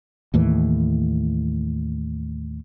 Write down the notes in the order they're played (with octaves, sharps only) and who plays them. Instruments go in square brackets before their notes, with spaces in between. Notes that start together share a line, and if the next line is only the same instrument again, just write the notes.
[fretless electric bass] D#2 A2 E3